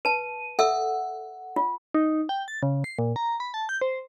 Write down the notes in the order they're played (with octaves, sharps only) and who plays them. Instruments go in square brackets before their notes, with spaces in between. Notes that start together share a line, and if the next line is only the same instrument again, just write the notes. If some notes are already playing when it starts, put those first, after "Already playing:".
[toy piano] B4 A5 [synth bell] D#7
[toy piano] A4 E5 E6 [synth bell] F#5
[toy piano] F4
[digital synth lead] D#4
G5
A6
C#3
C7
A#2
A#5
B5
A5
G6
C5